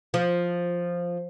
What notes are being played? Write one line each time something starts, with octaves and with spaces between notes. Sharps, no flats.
F3